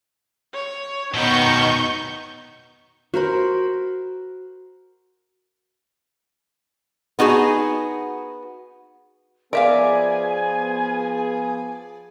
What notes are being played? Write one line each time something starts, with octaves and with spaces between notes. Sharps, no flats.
C#5
B2 D#3 B3 D#4 C#6 G6
F#4 A#4 C5 B5
B3 D#4 F#4 G#4
F3 B3 G#4 A#4 D5 E5 F5 G#5